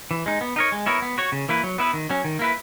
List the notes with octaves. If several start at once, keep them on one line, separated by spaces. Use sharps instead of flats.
E3
G#3 D#4
B3
D#4 A#4 C#5
G#3
B3 E4 A#4 C#5
B3
F#4 C#5
C#3
E3 A#3 E4 B4
F#3
B3 E4 B4
D#3
F#3 C#4
D#3
A#3 E4 B4